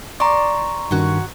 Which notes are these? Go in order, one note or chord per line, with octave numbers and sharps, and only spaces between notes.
D5 A#5 C6 C#6
G2 D#3 C#4 F#4